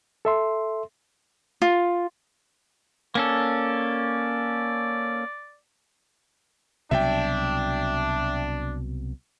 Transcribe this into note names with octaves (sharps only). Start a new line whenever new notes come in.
A4 E5 C6
F4
A#3 C#4 A4 D5
C2 B2 F#3 D4 E5 G5